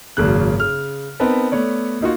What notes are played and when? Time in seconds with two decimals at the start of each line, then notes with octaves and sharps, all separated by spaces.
0.17 G#1 F#2 C#3 A#3 F#6
0.60 C#3 F6
1.20 B3 C4 D#4 A#4 B4 A5
1.52 A3 B3 C#5 D5
2.01 A#3 D#4 F4 F#4